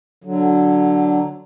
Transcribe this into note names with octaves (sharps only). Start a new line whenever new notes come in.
D3 F#3